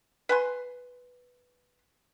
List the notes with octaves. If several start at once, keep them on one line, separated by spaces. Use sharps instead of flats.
B4 G#5 C6